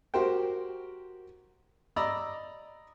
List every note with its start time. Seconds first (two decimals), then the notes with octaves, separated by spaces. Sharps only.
0.14 F#4 G4 A#4 C5 G5
1.96 D5 D#5 A#5 B5 E6